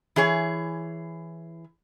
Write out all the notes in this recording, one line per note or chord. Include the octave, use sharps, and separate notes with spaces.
E3 G#4 C#5